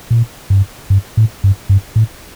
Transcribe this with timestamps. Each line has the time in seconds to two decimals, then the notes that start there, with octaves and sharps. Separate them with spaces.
0.11 A#2
0.50 G2
0.90 G2
1.17 A2
1.44 G2
1.69 G2
1.96 A2